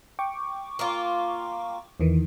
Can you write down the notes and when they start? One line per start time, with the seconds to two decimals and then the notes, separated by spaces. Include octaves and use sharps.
0.19 G5 C#6 D6
0.79 A#3 F4
2.00 E2 D#3 E3